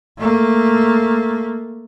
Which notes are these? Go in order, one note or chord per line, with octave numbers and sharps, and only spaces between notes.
A3 A#3